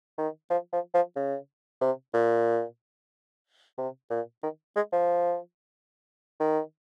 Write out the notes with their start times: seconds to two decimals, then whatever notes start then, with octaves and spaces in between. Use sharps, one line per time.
0.18 D#3
0.50 F3
0.73 F3
0.94 F3
1.16 C#3
1.81 C3
2.14 A#2
3.78 C3
4.10 A#2
4.43 D#3
4.76 G#3
4.92 F3
6.40 D#3